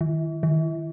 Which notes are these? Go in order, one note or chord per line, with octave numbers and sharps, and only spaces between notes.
D#3
D#3